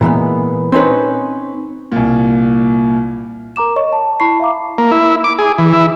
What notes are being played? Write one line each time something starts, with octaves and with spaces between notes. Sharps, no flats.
A#2 E3 G#3 B3
C4 C#4 D#4 B4 C#5
C2 A#2
A#4 A#5 D6 E7
C#5 D#5 C#6
A5
E4 A5 B5 C#6 C7
E5 F5 A#5 D6
A#3
E4
D6
G#4
E3
E4